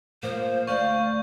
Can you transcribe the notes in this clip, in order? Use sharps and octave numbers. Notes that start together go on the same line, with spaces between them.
F3 A#3 C5
D2 D5 F5 C#6 G6